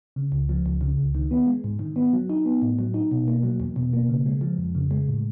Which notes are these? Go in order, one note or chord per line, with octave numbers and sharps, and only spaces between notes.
C#3
C#2
F3
C#2
C#3
C#2
D#3
B3
G#3
G#2
D#3
B3
F#3
D#4
B3
A2
F#3
D#4
B2
A#3
F#3
E2
B2
A#3
C#3
G#3
F3
F2
C#3
G#3
A2